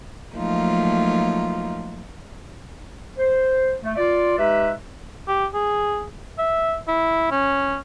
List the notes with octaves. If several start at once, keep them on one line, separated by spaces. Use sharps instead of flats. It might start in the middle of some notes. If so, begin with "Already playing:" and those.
F3 F#3 A3 A#3 D#4 F4
C5
A3
F4 D5
G#3 D#4 G4 B4 E5
G4
G#4
E5
E4
C#4